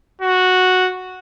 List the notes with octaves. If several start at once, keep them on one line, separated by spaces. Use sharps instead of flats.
F#4